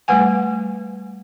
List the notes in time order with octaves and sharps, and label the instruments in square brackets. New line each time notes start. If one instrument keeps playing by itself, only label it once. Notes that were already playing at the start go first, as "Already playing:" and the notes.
[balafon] G3 A3 B4 F#5 G#5